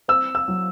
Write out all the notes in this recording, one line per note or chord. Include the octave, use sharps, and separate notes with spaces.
C4 E6
E6
F#3